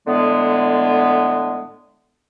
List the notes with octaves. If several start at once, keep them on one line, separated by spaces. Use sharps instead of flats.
A2 D3 G#3 B3